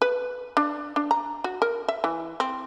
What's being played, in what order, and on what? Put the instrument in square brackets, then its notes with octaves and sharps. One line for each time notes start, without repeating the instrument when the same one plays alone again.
[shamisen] B4
D4
D4
A#5
F#4
A#4
E5
E3
C4